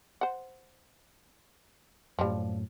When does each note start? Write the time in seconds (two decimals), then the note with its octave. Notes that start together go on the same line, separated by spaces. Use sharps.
0.21 C5 F#5
2.19 F#2 A2 F3 G3